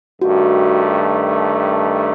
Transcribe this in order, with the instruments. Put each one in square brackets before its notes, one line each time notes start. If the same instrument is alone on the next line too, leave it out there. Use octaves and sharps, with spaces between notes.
[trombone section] G2 D#3 A3 [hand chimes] F#4